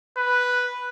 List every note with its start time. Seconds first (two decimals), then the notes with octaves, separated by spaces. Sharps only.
0.17 B4